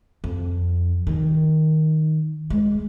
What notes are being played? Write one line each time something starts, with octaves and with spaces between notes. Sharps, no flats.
F2
D#3
G#3